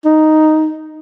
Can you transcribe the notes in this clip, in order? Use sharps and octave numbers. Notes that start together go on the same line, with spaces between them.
D#4